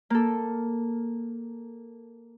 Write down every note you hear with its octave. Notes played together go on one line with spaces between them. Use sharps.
A#3 A4